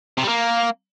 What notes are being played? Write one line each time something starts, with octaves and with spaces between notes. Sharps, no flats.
C3
G3
A#3